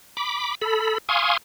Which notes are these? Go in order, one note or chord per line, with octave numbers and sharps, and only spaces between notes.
B5 D6
A4 B5
F5 G#5 C6 C#6 D#6